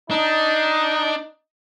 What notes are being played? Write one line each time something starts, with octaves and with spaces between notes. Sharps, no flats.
D4 D#4